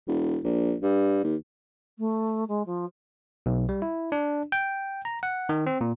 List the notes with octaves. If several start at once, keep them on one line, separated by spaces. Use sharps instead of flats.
E1
A#1
G2
D#2
A3
G#3
F3
B1
G3
E4
D4
G5
A#5
F#5
D#3
C4
A#2